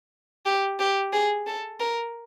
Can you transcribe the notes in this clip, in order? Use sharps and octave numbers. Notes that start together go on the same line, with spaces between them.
G4
G4
G#4
A4
A#4